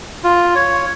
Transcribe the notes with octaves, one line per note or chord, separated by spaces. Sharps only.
F4
C#5